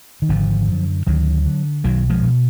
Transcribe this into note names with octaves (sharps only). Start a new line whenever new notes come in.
D#3
G#1 D3 F3
F#2 D3
D2 D#3 F#3
D3
B1 D#3 F#3
F3 G#3
B2